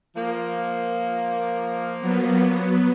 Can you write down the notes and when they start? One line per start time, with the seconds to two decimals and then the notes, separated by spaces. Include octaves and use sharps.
0.16 F3 A#3
2.00 F#3 B3